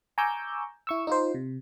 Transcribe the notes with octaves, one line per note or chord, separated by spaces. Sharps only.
G#5 A#5 C#6 D6 E6 G6
E4 C#6 E6
D#4 F4 C5
C3